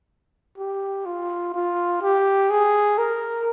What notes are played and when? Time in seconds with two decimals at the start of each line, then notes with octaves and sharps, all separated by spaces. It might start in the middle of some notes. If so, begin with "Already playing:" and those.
0.58 G4
1.05 F4
1.54 F4
2.02 G4
2.50 G#4
2.98 A#4